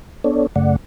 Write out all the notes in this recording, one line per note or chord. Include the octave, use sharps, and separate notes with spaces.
B3 D4 A4 C#5 D5
F#2 C#3 A3 D5 F#5